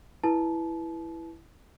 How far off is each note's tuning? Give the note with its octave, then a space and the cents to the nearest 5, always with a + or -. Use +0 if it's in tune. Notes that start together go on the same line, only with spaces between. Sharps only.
E4 +0 B4 -10 A5 -30